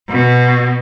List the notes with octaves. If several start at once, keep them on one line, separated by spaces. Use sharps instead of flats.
B2